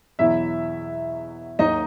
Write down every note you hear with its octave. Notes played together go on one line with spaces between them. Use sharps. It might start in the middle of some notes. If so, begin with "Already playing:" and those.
E2 B2 F#3 E4 E5
D#2 D#3 F#3 D#4 D#5